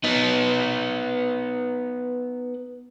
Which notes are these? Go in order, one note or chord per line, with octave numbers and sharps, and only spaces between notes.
B3 D#4